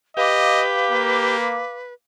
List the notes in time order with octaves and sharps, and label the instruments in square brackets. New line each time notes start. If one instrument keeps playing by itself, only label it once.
[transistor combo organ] G4 [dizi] B4 [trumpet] D#5 [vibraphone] F5 D6
[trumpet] A#3